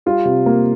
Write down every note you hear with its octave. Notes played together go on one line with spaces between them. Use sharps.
G3 F4
C3
A#3